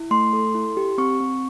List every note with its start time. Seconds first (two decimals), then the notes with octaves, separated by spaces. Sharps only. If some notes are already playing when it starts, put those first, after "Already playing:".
Already playing: E4
0.11 A3 C6
0.33 A4
0.55 E4
0.77 G4
0.98 C4 C#6
1.20 C4